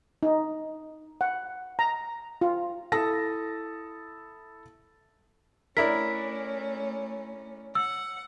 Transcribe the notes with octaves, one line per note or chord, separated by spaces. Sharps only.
D#4
F#5
A#5
F4
E4 A4 A5 D#6 E6 A#6
A3 C#4 D4 E4 A#4 B6
F#5 E6